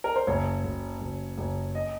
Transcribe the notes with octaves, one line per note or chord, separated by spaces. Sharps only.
A#4
C5
F#1 C#5
F#1
F#1
F#1
D#5